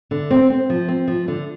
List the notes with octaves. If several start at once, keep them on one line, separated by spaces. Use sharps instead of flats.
D3
C4
C4
F3
C4
F3
D3